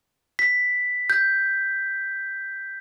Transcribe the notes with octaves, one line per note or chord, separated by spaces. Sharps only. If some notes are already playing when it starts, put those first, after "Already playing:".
B6
G6